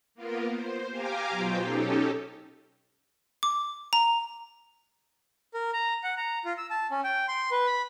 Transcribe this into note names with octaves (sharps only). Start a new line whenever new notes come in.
A#3 B3 F4 A#4
C5
G4 F5 G#5 A#5 D6
B2 F#3 F4 C5 G5
C#4 D#4 G4 A4
D6
A#5
A#4
A#5
F#5
A#5
F4
E6
A5
C#4
G5
C6
B4
B5